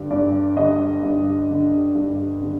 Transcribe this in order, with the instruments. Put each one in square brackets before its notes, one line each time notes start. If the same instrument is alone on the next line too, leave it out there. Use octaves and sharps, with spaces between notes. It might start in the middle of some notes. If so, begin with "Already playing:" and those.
Already playing: [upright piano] G2 D3 G3
G2 D5
D3 G3 D#5
G2
D3 G3
G2
D3 G3